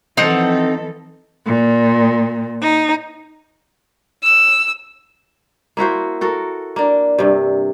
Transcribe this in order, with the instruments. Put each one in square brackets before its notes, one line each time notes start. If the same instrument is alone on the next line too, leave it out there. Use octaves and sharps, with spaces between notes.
[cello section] E3 F3 A4 [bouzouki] C4 D#4 F#5
[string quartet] A#2
D#4
[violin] E6
[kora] A#3 E4 F#4 C5
F#4 A4 A#4
A#3 D4
G2 C3